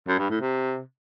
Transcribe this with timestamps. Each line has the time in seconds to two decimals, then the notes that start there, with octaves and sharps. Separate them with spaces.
0.08 F#2
0.19 G2
0.30 A2
0.40 C3